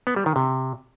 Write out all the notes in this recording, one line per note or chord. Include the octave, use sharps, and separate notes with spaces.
B3
G3
D#3
C3